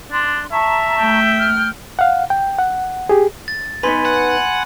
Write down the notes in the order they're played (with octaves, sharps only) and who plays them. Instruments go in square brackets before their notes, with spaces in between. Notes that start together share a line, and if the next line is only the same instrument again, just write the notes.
[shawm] D4 [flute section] C6
[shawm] E5 [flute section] A5 A#5 C#6
[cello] A3 [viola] G5
[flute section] F6
[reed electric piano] F5 F#5
G5
F#5
G4 G#4
[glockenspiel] A6
[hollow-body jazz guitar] B3 D#4 B4 [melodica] G#5 [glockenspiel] B5 C6
[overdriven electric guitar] F#5